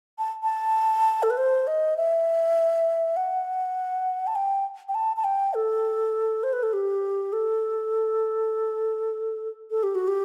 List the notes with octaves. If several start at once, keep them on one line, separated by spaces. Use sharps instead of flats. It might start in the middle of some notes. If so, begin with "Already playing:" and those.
A5
A5
A4
B4
C5
D#5
E5
F#5
A5
G5
G5
A5
A5
G5
A4
C5
B4
A4
G4
A4
A4
G4
F#4
G4